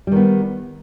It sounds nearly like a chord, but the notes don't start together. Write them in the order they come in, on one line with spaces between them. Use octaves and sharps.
G3 D#3 B3